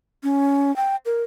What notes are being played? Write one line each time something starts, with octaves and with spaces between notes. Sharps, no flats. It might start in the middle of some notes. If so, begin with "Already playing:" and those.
C#4
G5
A#4